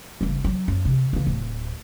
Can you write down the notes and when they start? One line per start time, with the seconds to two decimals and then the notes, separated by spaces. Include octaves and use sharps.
0.21 G1 C#2
0.44 F#3
0.68 F#2
0.85 C3
1.13 C#3 E3
1.27 D1